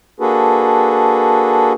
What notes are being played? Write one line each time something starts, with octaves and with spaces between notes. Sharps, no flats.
A#3 D4 F#4 G#4 A4 B4